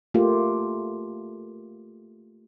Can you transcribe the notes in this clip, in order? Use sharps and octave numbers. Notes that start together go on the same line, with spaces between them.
A3 A#3 F4 G4